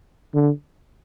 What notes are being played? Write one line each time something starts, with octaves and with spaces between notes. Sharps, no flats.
D3